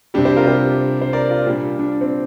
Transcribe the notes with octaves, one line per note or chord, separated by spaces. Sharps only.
C3 G3 D4 G4
G4 C5
F4 A#4
G4 C5
C5
A#4 D5
F4 A#4
A#2 G3 D4 G4
D4
C4